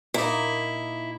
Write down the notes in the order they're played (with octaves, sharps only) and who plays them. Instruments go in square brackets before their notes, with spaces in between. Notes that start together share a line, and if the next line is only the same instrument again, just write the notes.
[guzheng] A#2 A#3 D#4 [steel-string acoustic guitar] E4